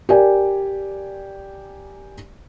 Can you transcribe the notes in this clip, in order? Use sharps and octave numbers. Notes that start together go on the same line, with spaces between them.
G4 A#4 D5 G#5